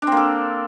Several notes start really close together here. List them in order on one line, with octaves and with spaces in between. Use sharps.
D4 C4 A#3 A4